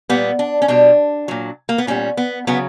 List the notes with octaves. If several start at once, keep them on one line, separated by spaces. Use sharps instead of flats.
A#2 G3 B3
D4
C#4
B2 G3 D4
A#2 F#3
A#3
B3
A#2 G3 C#4
B3
C#3 F#3 B3